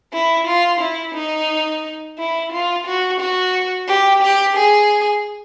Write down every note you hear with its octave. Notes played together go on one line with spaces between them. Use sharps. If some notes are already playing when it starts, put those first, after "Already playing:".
E4
F4
E4
D#4
E4
F4
F#4
F#4
G4
G4
G#4